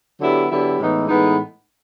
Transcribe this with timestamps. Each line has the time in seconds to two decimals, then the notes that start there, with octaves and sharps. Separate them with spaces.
0.21 D3 F#3 B3 E4 G4
0.50 D3 F#3 B3 E4 G4
0.79 A2 E3 G#3 B3 D#4
1.08 A2 E3 G#3 B3 D#4